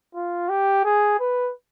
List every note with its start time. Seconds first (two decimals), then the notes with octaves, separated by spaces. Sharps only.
0.15 F4
0.49 G4
0.84 G#4
1.20 B4